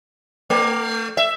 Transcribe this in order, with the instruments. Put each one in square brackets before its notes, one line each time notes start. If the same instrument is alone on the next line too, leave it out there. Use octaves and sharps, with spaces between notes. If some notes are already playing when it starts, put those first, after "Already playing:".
[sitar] A3
E5